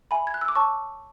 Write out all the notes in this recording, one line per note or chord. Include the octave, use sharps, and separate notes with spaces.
E5 G#5 B5
G#6
F#6
E6
D6
C#5 A5 C#6